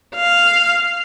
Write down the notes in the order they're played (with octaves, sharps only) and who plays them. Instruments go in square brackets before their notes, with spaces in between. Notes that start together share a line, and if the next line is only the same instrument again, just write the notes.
[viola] F5